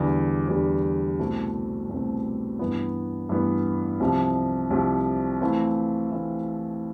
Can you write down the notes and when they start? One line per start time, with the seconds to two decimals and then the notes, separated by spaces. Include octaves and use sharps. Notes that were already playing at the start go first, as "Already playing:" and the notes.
Already playing: E2 D3 G3
0.48 E2 D3 G3
1.19 C2 B2 A3 C4
1.89 C2 B2 A3 C4
2.59 G2 E3 B3
3.29 G2 E3 B3
4.00 C2 C3 F3
4.70 C2 C3 F3
5.41 E3 A3 C4 F4
6.11 E3 A3 C4 F4